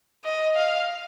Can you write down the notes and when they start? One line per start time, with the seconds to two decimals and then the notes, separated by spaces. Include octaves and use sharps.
0.24 D#5
0.56 F5